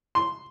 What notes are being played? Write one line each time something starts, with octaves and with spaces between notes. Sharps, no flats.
C6